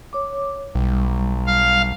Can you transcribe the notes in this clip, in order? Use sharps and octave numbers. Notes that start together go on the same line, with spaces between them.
C#5 D6
B1 G3
F5